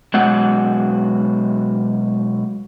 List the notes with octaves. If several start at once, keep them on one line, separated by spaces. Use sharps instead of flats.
B2 F#3 G#3 F#5